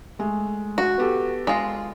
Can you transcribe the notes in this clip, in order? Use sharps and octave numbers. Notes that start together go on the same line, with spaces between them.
G#3 A3
F#4
B3 G4 A4
G#3 F4